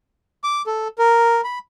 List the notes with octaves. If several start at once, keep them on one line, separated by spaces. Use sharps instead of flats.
D6
A4
A#4
B5